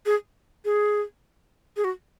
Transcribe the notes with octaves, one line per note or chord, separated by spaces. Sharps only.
G#4
G#4
G#4
F#4